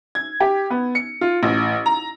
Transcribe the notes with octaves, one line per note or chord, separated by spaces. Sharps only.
G#6
G4
B3
C#7
F4
A1
A#5